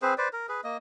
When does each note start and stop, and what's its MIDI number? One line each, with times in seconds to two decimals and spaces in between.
0.02 0.14 60
0.02 0.14 68
0.02 0.14 71
0.02 0.14 72
0.18 0.28 71
0.18 0.28 72
0.18 0.28 74
0.33 0.47 70
0.49 0.61 68
0.49 0.61 71
0.64 0.77 58
0.64 0.77 75